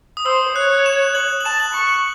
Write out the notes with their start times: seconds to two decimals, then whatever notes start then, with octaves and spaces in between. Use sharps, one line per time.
0.17 D#6
0.26 C5 E6
0.56 C#5 F#6
0.86 E7
1.15 F#7
1.40 F#7
1.45 A5 E7
1.60 F#7
1.74 C#6